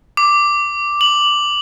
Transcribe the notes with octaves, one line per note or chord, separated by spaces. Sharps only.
D6
F#7